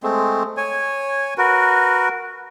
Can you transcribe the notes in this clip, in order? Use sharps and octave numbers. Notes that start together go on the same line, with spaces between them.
G#3 A3 C4
C#5 G#5
F#4 A#4 B4